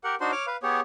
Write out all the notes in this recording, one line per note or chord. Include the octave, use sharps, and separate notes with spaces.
G4 A#4 F#5
D4 D#4 F#4 C5 C6
C#5 D6 F6
B4 F5
B3 G4 G#4 C#5